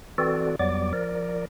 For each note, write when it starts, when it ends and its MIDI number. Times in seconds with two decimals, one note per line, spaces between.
0.18 0.56 52
0.18 0.56 60
0.18 0.56 66
0.18 0.56 69
0.18 0.56 74
0.59 0.93 41
0.59 0.93 54
0.59 0.93 55
0.59 0.93 59
0.59 0.93 74
0.59 0.93 86
0.93 1.45 53
0.93 1.45 70
0.93 1.45 74